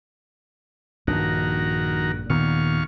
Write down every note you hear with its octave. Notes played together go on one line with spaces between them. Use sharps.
A#1 G2 D#3 F#4 A#4
D#2 A#2 D#3 B3 F5 C#6